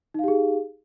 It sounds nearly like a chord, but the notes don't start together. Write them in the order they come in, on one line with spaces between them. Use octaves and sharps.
D#4 F5 G4 G#4